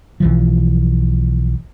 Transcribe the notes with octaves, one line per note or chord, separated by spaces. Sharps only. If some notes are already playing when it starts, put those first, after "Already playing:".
B1 E3 F3